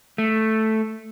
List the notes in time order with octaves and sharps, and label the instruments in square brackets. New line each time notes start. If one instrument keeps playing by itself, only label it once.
[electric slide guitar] A3